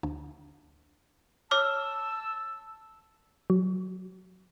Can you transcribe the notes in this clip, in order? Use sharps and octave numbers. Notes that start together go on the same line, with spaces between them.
D2
C#5 A5 D6 E6 F6
F#3